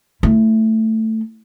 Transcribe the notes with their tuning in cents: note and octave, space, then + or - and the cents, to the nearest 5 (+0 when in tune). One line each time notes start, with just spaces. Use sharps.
A3 +10 E4 +0